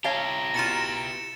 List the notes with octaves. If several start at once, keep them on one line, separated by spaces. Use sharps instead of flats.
E4 G4 C#5 F5 A5 A#5
B2 F4 A6 C#7 E7